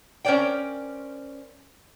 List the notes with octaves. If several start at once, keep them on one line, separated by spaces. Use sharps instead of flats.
C#4 A#4 C5 D5 G5